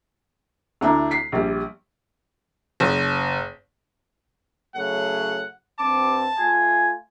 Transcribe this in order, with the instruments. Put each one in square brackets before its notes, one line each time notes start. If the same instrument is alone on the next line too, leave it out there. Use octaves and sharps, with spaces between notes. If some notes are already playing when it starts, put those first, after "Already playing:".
[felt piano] D2 D4 E4 A#5
B6 C7
A#1 G3
[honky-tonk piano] F#1
[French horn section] C#3 F#3 A3 [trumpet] F#5
[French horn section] G2 C4 [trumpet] A5 [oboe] D6
[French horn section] A3 F4 [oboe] G#5